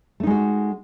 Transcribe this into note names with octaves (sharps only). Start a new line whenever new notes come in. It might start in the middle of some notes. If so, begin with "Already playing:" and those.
G#3 A3 D#4 F#4